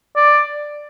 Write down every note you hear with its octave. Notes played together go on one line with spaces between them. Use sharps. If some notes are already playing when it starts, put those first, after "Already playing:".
D5